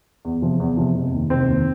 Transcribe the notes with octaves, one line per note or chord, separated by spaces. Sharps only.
E2
C3 F3
E2
C3 F3
F1
D#2 D#3
F1 C4
D#2 D#3